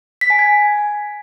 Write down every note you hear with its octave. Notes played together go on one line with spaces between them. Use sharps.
B6
G#5
G#6